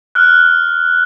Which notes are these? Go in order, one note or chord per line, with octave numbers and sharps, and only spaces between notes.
F6 F#6